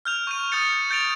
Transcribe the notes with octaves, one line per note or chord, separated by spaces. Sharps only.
F6 G6 F7
C#6 G6 D#7
D#6 F6 G6 A6 C#7
G6 A6 D7 F7